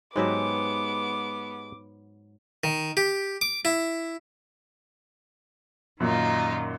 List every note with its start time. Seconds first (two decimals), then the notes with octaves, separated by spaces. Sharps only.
0.16 G#2 F#3 G#3 B3 G4 B4 E5 D6
2.64 D#3
2.97 G4
3.42 D6
3.65 E4
6.00 F#2 A#2 D#3 D#4 F4